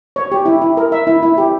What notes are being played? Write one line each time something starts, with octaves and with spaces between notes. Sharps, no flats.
C#5
G4
E4
E4
A#4
E5
E4
E4
G4